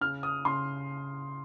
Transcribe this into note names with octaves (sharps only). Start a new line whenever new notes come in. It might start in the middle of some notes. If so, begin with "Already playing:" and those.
C#3 F6
D#6
C#3 C6